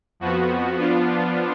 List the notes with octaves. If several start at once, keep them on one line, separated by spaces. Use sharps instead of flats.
F2 F3 B3 F#4
F3 B3 D4 F4